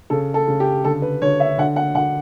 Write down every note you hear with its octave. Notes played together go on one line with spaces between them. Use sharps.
C#3 A4
A4
C#3
G4
D3 A4
B4
D3 C#5
E5
D3 F#5
F#5
D3 F#5